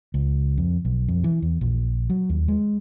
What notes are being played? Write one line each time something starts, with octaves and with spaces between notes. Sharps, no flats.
C#2
F2
B1
F2
E3
E2
A#1
F#3
D#2
G#3